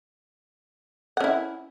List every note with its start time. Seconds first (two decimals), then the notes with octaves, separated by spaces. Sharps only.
1.17 F#5
1.20 C#4
1.24 E4